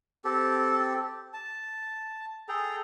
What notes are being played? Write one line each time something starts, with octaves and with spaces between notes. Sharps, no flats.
C4 G4 A4
A5
G#4 A4 G5 A#5